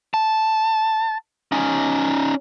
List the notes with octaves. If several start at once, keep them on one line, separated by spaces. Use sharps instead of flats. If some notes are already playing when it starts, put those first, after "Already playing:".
A5
C#4 D#4